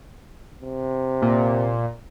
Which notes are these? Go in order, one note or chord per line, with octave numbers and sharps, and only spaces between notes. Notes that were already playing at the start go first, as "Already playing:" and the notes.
C3
A#2